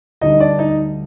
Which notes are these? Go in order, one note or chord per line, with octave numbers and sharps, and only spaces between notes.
D2 D3 G3 D#4 D#5
D4 D5
D#4 D#5